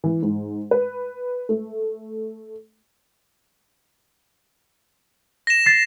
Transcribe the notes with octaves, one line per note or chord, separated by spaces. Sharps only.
E3
G#2
B4
A3
A#6 E7
A6 C7